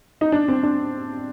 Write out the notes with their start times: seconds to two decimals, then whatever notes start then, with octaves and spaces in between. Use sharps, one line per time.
0.21 D#4
0.32 D4
0.48 C4
0.63 D4